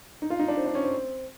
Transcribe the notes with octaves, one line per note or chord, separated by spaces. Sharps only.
D#4
F4
D#4
D4
C4
D4
C#4
C4